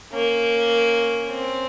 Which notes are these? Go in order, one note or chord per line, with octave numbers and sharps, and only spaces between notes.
A#3 C#4
C4